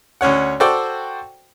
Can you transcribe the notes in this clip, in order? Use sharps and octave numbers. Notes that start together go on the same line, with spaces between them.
D2 C#4 C#5 F#5
F#4 A4 C5 D5 G5